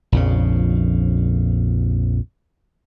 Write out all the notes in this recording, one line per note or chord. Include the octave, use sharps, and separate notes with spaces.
A#1 F2 C#3